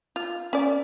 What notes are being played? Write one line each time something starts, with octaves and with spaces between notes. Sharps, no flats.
F4
C#4 D5